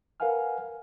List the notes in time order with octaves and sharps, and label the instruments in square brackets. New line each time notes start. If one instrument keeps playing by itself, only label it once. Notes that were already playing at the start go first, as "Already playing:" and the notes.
[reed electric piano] A#4 B4 F5 F#5 G#5 F6